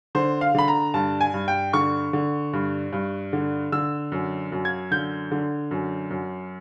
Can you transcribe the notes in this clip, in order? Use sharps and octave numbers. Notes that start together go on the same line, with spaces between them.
D3 C5
F5
D3 B5
A#5
G2 A5
G#5
G2
G5
D3 C#6
D3
G2
G2
D3
D3 E6
F#2
F#2
G#6
D3 G6
D3
F#2
F#2